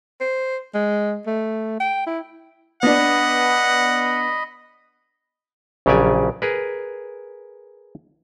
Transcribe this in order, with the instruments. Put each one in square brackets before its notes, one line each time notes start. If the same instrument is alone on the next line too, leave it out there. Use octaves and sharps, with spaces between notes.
[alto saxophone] C5
G#3
A3
G5
E4
[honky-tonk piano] B3 D4 [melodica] D#5 B5 [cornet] F#5
[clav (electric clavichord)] A#1 C#3 F#3 G4 D5 G#5
G#4 A#4 B4